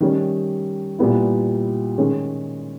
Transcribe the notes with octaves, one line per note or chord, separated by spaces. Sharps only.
D#3 G3 C#4
A#2 G3 B3 E4
D#3 G#3 C#4